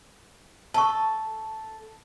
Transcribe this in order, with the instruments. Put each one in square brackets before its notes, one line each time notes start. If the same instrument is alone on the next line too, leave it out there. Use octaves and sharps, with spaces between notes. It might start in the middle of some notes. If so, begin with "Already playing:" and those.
[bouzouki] A4 [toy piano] A5 C#6